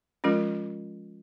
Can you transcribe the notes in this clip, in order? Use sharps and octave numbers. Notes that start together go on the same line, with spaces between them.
F3 G#3 C#4 F4 A#4